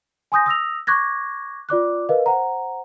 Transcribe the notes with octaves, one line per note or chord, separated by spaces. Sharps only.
G#5 C6 D#6 G6 A#6
D#6 E6 A#6 F7
C#6 D6 F#6 G#6 A#6
F4 D5 D6 F#6
A#4 B4 D#5 F5
C5 F#5 A#5